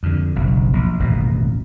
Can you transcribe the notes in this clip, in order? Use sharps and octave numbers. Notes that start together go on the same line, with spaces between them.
F2 D3
F#1 B1 F#2
A#1
D#1 A1 F#2 B2